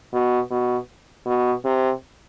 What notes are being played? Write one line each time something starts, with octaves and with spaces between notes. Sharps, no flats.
B2
B2
B2
C3